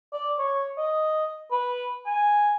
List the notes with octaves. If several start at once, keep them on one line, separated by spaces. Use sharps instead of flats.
D5
C#5
D#5
B4
G#5